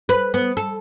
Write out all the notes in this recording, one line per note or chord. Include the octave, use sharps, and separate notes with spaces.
B4
B3
A4